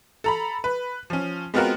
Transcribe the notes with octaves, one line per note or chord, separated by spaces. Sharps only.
A4 A#5 B5
B4
F3 C#4
G#3 B3 C4 F4 F#4 A#4